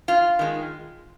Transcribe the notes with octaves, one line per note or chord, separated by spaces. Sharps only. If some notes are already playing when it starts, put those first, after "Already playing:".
F4
D#3 G#3